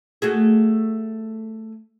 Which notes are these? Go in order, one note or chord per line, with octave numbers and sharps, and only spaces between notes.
A3 F#4 G#4